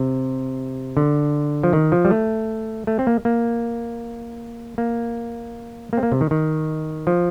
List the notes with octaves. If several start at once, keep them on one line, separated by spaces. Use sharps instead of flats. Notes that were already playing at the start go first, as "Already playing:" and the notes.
Already playing: C3
D3
F3
D#3
F3
G3
A3
A3
C4
A#3
A#3
A#3
A#3
C4
A#3
C3
D#3
D#3
F3